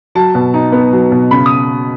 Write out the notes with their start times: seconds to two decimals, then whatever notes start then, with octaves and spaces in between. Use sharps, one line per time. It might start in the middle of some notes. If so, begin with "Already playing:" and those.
0.15 F#3 A5
0.35 B2
0.54 D#4
0.72 B3
0.93 F#3
1.12 B2
1.31 C#3 B5
1.46 D#6